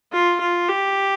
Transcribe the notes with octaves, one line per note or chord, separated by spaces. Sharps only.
F4
F4
G4